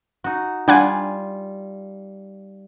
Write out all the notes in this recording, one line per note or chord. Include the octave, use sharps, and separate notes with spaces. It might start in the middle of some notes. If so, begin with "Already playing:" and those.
D#4 F#4
G3 D4 F4 F#5 G#5